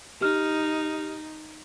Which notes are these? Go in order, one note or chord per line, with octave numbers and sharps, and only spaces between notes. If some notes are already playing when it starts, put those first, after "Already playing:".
D#4 G4 F6